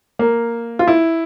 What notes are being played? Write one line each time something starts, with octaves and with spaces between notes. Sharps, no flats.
A#3
F4
E4